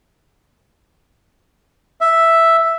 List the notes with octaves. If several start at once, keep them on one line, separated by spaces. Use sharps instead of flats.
E5